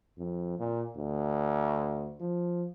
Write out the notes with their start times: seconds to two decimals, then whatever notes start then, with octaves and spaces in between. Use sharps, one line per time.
0.18 F2
0.59 A#2
0.96 D2
2.20 F3